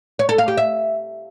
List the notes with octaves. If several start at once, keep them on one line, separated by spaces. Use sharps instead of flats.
C#5
A4
F5
G4
E5